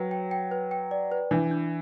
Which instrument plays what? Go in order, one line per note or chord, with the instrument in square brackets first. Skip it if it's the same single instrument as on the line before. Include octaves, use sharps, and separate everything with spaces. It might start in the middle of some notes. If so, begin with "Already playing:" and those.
Already playing: [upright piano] F#3 [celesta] B4 G5
[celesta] G5
G5
B4
G5
D5
B4
[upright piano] E3 [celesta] D4
[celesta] D4